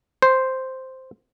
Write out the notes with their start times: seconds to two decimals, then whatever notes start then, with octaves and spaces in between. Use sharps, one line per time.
0.22 C5